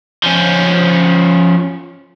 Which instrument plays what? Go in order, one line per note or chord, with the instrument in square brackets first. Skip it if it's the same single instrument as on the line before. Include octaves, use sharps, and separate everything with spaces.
[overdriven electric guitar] F3 C#4